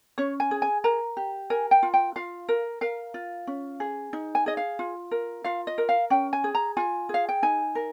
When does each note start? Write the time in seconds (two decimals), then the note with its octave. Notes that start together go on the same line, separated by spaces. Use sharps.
0.18 C#4 C#5
0.40 G#5
0.51 G#4
0.62 G#5
0.84 A#4 A#5
1.17 G4
1.50 A#4 G#5
1.71 G5
1.83 F4
1.94 G5
2.16 F4 F5
2.49 A#4
2.81 A#4 F5
3.14 F4
3.47 C#4
3.80 G#4
4.13 D#4
4.35 G#5
4.46 G#4 D#5
4.57 F5
4.79 F4
5.11 A#4
5.44 F4 F5
5.67 D#5
5.78 A#4
5.89 F5
6.10 C#4 G5
6.33 G#5
6.44 G#4
6.55 A#5
6.77 F4 G#5
7.09 G#4 F5
7.29 G5
7.43 D#4 G#5
7.75 A#4